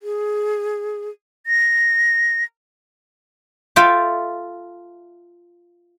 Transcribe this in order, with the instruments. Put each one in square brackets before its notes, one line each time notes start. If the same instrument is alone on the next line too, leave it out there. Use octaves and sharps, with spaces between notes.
[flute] G#4
A#6
[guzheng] F4 A4 E5 G5